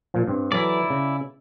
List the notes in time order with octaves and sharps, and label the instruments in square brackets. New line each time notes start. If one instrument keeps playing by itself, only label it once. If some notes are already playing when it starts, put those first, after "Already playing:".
[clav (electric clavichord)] A#2 F3
G2 C4
[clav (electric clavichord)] E3 F#3 A4 [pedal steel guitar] E4 D5
[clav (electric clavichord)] C#3